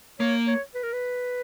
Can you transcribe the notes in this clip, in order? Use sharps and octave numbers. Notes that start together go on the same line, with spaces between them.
A#3 C#5
C#5
B4
A#4
B4